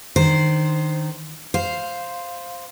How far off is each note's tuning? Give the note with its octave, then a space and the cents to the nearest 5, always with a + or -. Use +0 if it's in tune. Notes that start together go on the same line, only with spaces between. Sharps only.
D#3 -10 D4 +0 C5 +0
C5 +0 F5 +0